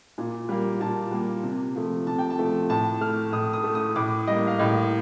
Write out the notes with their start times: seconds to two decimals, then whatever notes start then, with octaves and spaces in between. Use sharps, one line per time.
0.18 A#2
0.49 G3 A#3
0.80 A#2 A5
1.12 G3 A#3
1.44 C3
1.76 F3 A3
2.07 C3 A5
2.18 G5
2.30 A5
2.39 F3 A3
2.69 A2 A5
3.01 A3 F6
3.32 A2 D#6
3.53 D#6
3.64 A3
3.75 D#6
3.96 A2 D6
4.27 G3 A#3 D#5
4.47 F5
4.59 A2 D#5